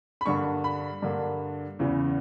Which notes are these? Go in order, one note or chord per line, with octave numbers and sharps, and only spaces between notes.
B5
G2 D3 A#3 C#6
B5
G2 D3 A#3
E2 C#3 E3